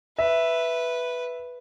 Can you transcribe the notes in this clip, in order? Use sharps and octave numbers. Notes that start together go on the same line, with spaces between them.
B4 E5